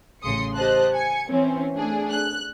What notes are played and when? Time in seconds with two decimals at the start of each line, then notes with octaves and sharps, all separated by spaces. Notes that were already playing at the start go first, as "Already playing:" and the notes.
0.22 A1 C#3 C6 D#6 C#7
0.55 G4 C5 D#5 A5 F#6
0.94 G#5 G#6 C#7
1.29 E3 C4 C#4
1.76 A3 D4 G#4
2.12 F#6